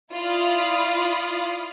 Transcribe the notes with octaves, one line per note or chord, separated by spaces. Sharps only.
E4 F4 D5 F5 B5 D#6